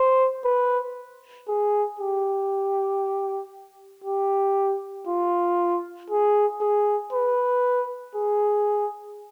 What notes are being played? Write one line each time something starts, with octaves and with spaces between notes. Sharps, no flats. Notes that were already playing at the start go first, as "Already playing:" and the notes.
Already playing: C5
B4
G#4
G4
G4
F4
G#4
G#4
B4
G#4